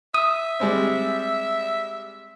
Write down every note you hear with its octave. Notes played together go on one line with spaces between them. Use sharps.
E5 D#6
G3 G#3 C4